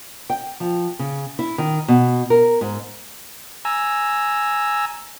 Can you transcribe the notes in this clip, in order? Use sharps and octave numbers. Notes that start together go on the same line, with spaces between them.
G5
F3
C#3
E4
D#3
B2
A#4
G#2
G#5 A#5 E6